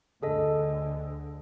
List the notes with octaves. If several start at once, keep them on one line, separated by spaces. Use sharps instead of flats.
D2 D3 G#4 A4 D#5